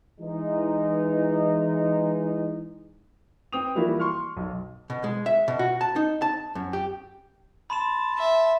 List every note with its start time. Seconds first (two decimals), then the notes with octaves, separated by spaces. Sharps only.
0.20 E3 G#3 D#4
3.53 C4 B4 G5 D#6 F7
3.75 E3 F3 G3 A#3 E4 F#4
4.00 C6 C#6 F6
4.37 B1
4.90 B2
5.04 G#3
5.26 E5
5.48 B2
5.59 F#4
5.81 A5
5.96 D#4
6.22 A5
6.55 F#2
6.73 G4
7.70 A5 B5 C6 E7
8.18 E5